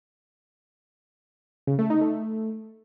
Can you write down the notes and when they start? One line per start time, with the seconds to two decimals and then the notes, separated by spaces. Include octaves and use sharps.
1.67 C#3
1.79 A3
1.90 D#4
2.01 A3